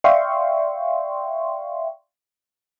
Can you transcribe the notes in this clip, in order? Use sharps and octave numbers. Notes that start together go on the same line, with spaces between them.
D5 E5 F5 G5 C6 C#6